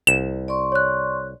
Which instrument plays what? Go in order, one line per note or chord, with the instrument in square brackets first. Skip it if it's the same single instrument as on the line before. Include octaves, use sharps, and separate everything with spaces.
[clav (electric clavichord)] C2 [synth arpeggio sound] E7
[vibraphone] D5 C6 C#6
[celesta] C#5 F#6